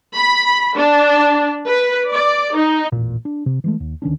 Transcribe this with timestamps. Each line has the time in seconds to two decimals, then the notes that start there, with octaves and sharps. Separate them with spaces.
0.16 B5
0.77 D4
1.65 B4
2.09 D5
2.54 D#4
2.92 E1 A1 A#2
3.25 D4
3.46 C3
3.64 E3 G#3 A3
3.80 D#2
4.02 D2 D#3 C#4 D4